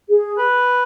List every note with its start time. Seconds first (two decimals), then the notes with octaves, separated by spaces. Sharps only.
0.09 G#4
0.38 B4